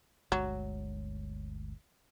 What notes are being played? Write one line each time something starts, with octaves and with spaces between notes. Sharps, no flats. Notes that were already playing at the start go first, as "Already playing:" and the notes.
G1 D2 F#3 G#3